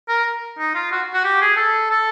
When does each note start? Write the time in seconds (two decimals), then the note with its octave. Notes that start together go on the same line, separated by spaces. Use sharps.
0.09 A#4
0.59 D#4
0.75 F4
0.92 F#4
1.14 F#4
1.24 G4
1.41 G#4
1.57 A4
1.90 A4